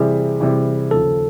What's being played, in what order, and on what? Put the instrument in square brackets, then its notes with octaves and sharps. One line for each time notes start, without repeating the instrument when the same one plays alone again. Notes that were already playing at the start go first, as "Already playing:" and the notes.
Already playing: [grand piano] C3 E3 G3 [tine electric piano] G#4
[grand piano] C3 E3 G3
[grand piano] D#2 C#3 F3 [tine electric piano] A4